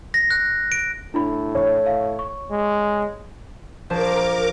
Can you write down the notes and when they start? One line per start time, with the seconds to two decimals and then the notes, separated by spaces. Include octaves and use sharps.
0.14 A#6
0.31 F#6
0.72 D7
1.14 A2 D4 E4 B5
1.55 C#5
1.86 F5
2.19 C#6
2.50 G#3
3.90 A#1 A#4 C5 A5 D6